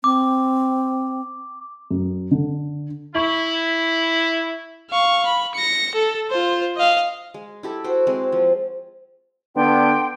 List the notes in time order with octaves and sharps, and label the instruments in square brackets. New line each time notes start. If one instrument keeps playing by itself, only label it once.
[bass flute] C4 [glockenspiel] D6
[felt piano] F#2
D3
[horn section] E4 [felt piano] C#6
[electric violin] F5 C#6
B5
A#6 C#7
A4
F4 C5
D#5 F5
[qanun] G#3
E4 G4 A4
F#4 C5 G5
G#3 C4
F3
[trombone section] D3 B3 D4 [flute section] G5 C6 D6